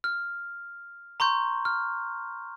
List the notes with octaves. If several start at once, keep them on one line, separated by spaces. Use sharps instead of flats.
F6
A#5 C6 C#6 G6
F6